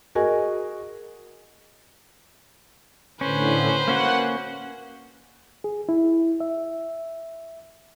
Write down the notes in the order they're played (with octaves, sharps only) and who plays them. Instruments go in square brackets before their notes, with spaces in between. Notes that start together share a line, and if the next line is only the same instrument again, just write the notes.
[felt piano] F#4 G#4 A#4 D#5 G#5
[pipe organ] A2 D3 [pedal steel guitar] C#4 [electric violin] B4 C5
[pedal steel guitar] A#3 C#4 F#4 [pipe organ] F#5
[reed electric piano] G#4
E4
E5